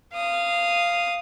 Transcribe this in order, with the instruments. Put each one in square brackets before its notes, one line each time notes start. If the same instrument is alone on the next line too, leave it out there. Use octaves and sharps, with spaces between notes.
[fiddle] F5 D#6